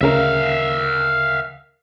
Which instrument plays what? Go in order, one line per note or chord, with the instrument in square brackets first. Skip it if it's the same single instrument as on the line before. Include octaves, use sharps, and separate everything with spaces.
[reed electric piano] D2 C#3 A#4 [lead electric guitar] E5 F5